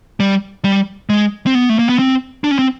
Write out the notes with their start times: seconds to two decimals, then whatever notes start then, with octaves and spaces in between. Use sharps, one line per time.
0.20 G3
0.65 G3
1.09 G#3
1.47 C4
1.55 B3
1.69 A3
1.79 A#3
1.89 B3
1.99 C4
2.44 D4
2.51 C#4
2.59 C4